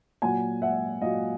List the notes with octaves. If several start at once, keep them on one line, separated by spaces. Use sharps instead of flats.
A#2 F#3 F#5 G#5
E5 F#5
A#2 F#3 D#5 F5